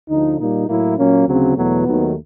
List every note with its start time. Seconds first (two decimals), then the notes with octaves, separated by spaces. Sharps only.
0.09 D2 D3 F3 D#4
0.39 A#2 G3 A#3 D#4
0.68 A2 F#3 A#3 E4
0.97 A#2 F#3 A#3 C#4
1.27 D2 C#3 F#3 C4
1.56 E2 B2 F#3 A3 B3
1.86 D#2 D#3 F#3 A3